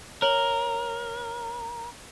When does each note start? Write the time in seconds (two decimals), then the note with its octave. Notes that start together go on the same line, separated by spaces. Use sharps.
0.22 A#4 C#5 F#7